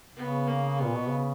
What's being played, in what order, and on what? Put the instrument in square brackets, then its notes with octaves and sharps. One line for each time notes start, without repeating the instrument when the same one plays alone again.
[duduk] C#3 [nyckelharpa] B3
[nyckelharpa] A#3
B3
[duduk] A#2
B2
C#3